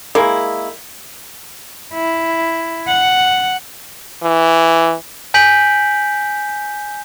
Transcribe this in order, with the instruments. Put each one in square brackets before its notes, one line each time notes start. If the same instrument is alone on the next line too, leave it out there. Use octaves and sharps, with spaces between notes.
[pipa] G#3 A#3 E4
[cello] E4
F#5
[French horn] E3
[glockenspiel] G#5 G6 B6 D7 F#7